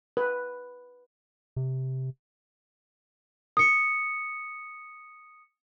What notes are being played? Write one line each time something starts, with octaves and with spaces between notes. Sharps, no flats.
B4
C3
D#6 C#7